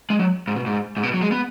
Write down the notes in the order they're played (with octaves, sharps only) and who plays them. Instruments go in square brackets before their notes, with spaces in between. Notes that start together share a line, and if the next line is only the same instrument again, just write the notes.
[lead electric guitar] G#3
F#3
G#2
B2
G#2
G#2
B2
F#3
G#3
B3